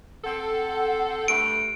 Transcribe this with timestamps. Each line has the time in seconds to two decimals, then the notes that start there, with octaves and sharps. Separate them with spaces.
0.24 C4 A4 F#5
1.28 G2 A3 D7